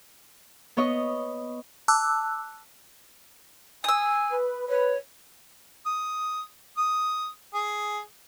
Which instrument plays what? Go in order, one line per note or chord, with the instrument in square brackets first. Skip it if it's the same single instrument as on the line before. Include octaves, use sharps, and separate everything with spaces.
[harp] B3 C#5 D#5
[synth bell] A5 D6 E6 F#6
[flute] G#5 [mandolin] D#6 E6
[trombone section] B4
[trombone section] B4 [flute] C#5
[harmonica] D#6
D#6
G#4